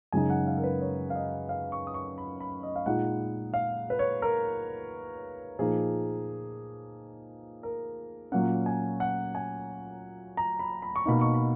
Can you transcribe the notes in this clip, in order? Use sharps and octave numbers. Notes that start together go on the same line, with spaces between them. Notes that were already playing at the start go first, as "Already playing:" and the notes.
F#2 C#3 G#3 D#4 G#5
F#5
F5
A#4
B4
C#5
F5
D#5
F5
C#6
D#6
C#6
B5
B5
D#5
F5
A#2 G#3 D#4 F#5
F5
B4
C#5
A#4
A#2 F3 A#3 D#4 G#4
A#4
A#2 F#3 A#3 C#4 F#5
G#5
F#5
G#5
A#5
B5
B5
C#6
B2 A#3 D#4 B5
C#6
B5